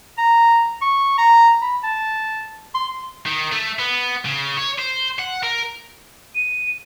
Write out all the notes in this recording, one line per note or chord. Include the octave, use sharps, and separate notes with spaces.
A#5
C#6
A#5
B5
A5
C6
D#3
A3
B3
C#3
C#5
C5
F#5
A#4
D#7